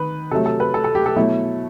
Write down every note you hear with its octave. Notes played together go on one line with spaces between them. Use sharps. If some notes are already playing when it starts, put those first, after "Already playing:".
Already playing: D#3 B4
C3 F#3 A3 A4
A4
B4
A4
A4
G4
A4
B2 F#3 A3 E4